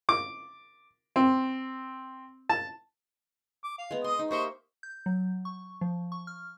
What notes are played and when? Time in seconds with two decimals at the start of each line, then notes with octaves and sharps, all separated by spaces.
0.09 D6
1.16 C4
2.49 A5
3.64 D6
3.78 F5
3.91 G#3 B3
4.04 D#5 C6 D#6
4.19 D#4
4.31 A#3 G4 C5 D#5 E5 C#6
4.83 G6
5.06 F#3
5.45 C#6
5.81 F3
6.12 C#6
6.27 F6